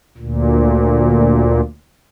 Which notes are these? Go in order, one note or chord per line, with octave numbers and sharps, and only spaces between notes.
D2 A#2